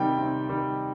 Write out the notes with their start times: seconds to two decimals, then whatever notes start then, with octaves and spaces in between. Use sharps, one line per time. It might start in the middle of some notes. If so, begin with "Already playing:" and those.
Already playing: C3 D#3 G3 G5
0.18 C3
0.49 D#3 G3